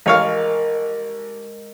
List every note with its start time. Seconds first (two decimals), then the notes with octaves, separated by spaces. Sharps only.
0.06 A1 G#3 A#4 C#5 F5